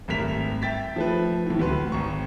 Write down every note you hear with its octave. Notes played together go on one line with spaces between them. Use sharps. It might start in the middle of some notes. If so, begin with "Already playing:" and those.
G#1 G2 A3 A#4 B6 F7
E5 G5 A6 B6
F3 A3 B4
A2 E3
D2 F#4 B4 C6
G#1 A#5 C#6